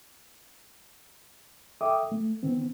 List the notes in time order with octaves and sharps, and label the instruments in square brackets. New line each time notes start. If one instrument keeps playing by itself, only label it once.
[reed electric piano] A4 E5 G5 D6 D#6
A3
D#3 B3 C4